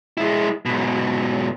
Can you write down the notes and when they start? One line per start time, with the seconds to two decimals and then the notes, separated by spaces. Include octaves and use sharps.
0.18 G#3 E4
0.65 G#2 B2